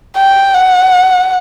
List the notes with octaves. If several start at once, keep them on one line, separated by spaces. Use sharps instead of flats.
G5
F#5